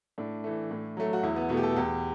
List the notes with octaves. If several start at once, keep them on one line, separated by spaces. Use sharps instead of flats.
A2 D4
E3 A3
A2
F#3 A3
F#4
E2 E4
B3
B2 A3 B3
G4
A4
E2 G4